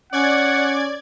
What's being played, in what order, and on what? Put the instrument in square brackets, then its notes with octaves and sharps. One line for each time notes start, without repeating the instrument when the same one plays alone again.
[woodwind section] C#4 [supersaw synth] D5 G#6 [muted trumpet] F#5